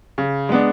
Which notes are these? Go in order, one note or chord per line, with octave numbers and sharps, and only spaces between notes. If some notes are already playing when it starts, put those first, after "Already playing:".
C#3
G#3 B3 D4